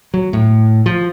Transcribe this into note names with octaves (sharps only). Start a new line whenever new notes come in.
F#3
A2
F3